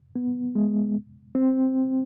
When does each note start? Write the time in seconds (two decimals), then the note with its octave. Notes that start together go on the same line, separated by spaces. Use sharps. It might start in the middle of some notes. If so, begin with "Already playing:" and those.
0.16 B3
0.55 G#3
1.35 C4